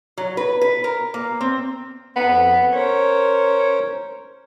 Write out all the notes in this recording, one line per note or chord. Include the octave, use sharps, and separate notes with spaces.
F#3
B4
B4
A#4
A#3
C4
F2 B3
C#4 A#4 C5 C#5